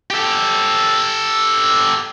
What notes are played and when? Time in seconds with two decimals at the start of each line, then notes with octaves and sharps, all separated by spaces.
0.10 G4 A4